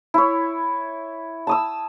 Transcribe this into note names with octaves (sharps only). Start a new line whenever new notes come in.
E4 C#5
A5 D#6 E6